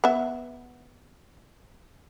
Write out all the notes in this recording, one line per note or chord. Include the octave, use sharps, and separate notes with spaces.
B3 E5